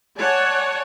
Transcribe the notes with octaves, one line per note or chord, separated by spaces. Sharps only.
C#5 D5 F#5 G#5 A5